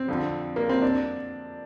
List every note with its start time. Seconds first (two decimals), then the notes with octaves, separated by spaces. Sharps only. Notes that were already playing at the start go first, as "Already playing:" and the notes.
Already playing: C4
0.08 F2 D3
0.56 A#3
0.69 C4
0.82 D4